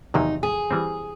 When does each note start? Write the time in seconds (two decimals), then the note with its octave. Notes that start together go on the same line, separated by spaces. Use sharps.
0.14 E2 C3 D#3 F#3 A#3 D#4
0.43 G#4
0.71 E3 G3 C4